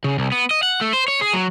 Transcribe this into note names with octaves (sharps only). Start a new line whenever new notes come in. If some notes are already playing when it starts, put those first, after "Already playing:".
C#3
C2
B3
D#5
F#5
A3
C5
C#5
G#4
F#3